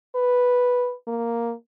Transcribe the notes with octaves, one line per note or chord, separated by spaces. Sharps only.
B4
A#3